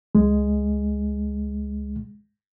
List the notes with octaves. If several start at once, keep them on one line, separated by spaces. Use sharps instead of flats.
C#2 G#3